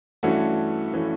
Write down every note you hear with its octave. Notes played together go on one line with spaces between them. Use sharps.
G2 E3 A3 C#4 F#4
E3 A3 C#4